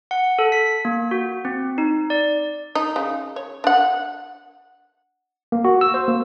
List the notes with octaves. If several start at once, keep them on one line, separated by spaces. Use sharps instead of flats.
F#5
A4
B6
A#3
F#4
C4
D#4
D5
D#4
C#3
C#5
D4 F#5
A#3
F#4
E6
C5
A#3